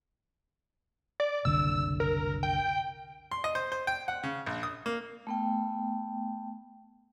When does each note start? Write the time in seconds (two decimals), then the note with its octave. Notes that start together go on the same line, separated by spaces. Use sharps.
1.20 D5
1.45 F#1 C2 D3 E6
2.00 A#4
2.43 G5
3.31 C6
3.44 D#5
3.55 C5
3.72 C5
3.87 G5
4.08 F#5
4.23 C#3
4.46 A#1
4.63 D#6
4.86 A#3
5.27 A3 B3 G5